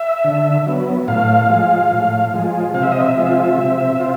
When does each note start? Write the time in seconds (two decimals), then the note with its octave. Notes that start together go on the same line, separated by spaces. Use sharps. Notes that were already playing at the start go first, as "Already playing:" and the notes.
Already playing: E5
0.24 D3
0.66 F#3 B3
1.08 A2 F5
1.50 F3 G#3
1.91 A2
2.33 F3 G#3
2.74 C3 F5
2.83 E5
2.92 D#5
3.01 E5
3.16 F3 G#3 C4 F4
3.58 C3
4.00 C4 F4